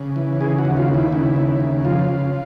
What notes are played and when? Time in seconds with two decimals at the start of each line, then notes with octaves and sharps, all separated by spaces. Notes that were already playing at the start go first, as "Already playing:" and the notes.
Already playing: C#3
0.16 E3
0.41 C#3 G#4
0.58 F#4
0.65 D#2
0.77 F4
0.88 D#2
0.94 E4
1.12 C#3 E4
1.36 D#2
1.60 C#3
1.85 F2 F4
2.09 C#3